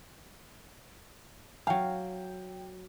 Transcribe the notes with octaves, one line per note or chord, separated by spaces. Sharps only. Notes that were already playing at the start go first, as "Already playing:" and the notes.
F#3 F5 G5